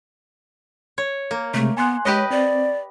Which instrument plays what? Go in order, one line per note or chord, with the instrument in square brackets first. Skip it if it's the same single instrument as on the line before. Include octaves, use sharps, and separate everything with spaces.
[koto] C#5
A#3
[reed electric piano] C3 G#3 [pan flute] A3
[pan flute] B3 [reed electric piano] G#5 C6 F#6
[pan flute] G#3 [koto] G4 B4 D#5 [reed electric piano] C#5
[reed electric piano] C4 [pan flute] D5